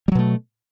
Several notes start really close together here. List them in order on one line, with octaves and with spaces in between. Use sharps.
G3 F#3 B2 A3